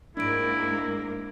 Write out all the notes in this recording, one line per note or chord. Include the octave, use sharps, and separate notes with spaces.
G#2 A#3 D4 E4 A#4 D7